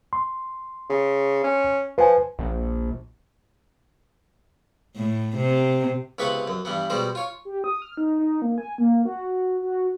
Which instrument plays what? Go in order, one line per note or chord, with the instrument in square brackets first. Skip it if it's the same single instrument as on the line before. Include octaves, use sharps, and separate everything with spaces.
[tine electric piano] C6
[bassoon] C#3
C#4
[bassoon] F3 [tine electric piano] B4 G#5
[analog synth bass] A#1
[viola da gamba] A2
C3
[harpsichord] C#2 C3 B3 B4 B5 C#6
F#2
G2 E3 B3
B2 G3 G#3 C5
F4 C#5
[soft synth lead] G4
D#6
F6
D#4
D#4
A#3
G#5
A#3
F#4
F#4